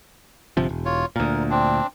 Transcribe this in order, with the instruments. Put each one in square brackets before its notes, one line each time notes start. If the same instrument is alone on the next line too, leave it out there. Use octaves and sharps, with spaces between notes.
[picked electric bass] G1 C3 F3
E1
[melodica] F4 C#5
[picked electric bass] D2 A#2 [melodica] A#4
[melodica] C4 D4